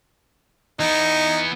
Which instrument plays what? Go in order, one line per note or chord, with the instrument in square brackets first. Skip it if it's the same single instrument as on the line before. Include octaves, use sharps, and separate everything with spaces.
[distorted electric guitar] E3 B3 [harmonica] D#4